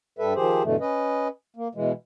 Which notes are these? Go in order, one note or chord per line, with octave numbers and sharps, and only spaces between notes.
G2 G3 A4 B4 E5
D#3 F3 G4 G#4 C5
G2 B2 D3 E3 A3
C#4 B4 D#5
A#3
B2 E3 G#3